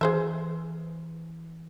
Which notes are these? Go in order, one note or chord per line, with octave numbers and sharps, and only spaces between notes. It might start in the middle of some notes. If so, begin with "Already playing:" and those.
E3 G#4 C5 E5